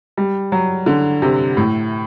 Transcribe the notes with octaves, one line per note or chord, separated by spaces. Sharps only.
G3
F#3
D3
C3
A2